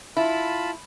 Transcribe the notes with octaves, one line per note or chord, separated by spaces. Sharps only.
E4 F4 A5 B5